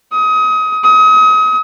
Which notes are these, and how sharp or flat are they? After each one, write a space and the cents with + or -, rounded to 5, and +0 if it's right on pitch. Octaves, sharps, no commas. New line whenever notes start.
D#6 +25
D#6 +35